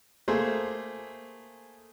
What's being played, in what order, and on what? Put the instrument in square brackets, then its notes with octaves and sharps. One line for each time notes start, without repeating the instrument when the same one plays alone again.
[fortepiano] A3 A#3 G#4 C5